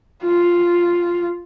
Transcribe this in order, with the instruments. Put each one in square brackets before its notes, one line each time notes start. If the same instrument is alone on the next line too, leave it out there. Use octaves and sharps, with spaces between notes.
[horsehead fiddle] F4